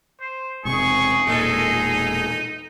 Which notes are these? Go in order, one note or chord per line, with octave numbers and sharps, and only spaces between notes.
C5
E1 C3 C4 G#4 C#6
E1 A#2 G#3 D#4 A4